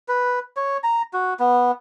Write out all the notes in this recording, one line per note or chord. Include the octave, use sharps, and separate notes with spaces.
B4
C#5
A#5
F#4
B3